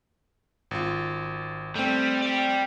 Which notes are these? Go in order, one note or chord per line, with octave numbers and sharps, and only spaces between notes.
G#1 F4
G3 A3 C4
D5 G5